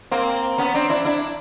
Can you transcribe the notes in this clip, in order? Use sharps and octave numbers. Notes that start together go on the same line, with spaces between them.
A#3 C4
B3 C#4
C4 D4
D4 E4
D4 E4